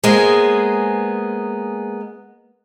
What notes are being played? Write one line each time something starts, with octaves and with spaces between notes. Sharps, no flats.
G#3 A#3 B3 G#4 C5